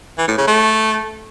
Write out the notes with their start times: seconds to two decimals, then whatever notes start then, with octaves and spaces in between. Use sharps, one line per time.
0.18 E3
0.28 A2
0.38 C#3
0.47 A3